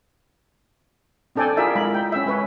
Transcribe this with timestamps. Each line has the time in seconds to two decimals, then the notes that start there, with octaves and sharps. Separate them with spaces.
1.36 C4 D4 A4 D5 G5 G#5
1.57 E4 F4 G#4 A#4 D5 E5
1.75 G#3 A#4 B5
1.95 G5
2.12 C#4 E5
2.26 G#3 C#4 B4 C#5